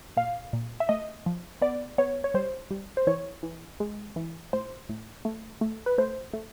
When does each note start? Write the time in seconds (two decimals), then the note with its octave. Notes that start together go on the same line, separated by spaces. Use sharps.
0.17 A#2 F5
0.53 A#2
0.80 E5
0.89 A3 D#5
1.26 F3
1.61 B3 D5
1.98 B3 C#5
2.24 C#5
2.34 G3 C5
2.71 G3
2.97 C5
3.07 E3 C#5
3.43 E3
3.80 G#3
4.16 E3
4.53 A2 C5
4.89 A2
5.25 A3
5.61 A3
5.86 B4
5.98 A3 C5
6.33 A3